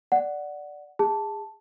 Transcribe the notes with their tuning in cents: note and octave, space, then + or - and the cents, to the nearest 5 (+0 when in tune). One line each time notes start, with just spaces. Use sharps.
D5 +0 F#5 +0
G#4 -30 A5 +0